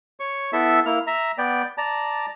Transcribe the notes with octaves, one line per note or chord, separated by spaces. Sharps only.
C#5 C#6
B3 E4 A4 E5
A#3 E4 F6
E5 A#5
B3 D5 G5
D5 A5 A#5